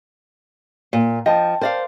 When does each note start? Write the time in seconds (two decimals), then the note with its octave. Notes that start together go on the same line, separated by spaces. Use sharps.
0.93 A#2
1.26 F3 D#5 G5 A5
1.61 A#4 C5 D5 F5